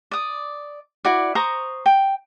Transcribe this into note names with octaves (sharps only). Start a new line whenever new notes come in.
D5 D#6
E4 F#4 D5
C5 A#5 C#6 D#6
G5